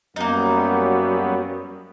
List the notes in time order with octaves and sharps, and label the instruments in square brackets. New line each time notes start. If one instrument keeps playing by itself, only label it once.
[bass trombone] F#2 [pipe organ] F#3 G3 B3 [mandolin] A#3 D#4